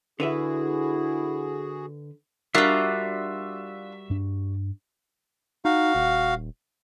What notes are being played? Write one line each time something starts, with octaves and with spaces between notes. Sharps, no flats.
D3 E4 F#4 G#4 B4 E5
G3 D4 F4 F#4 A#4 E5
G2 D4
D#4 F#4 F5
D#1